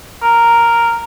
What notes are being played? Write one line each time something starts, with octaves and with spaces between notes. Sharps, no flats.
A#4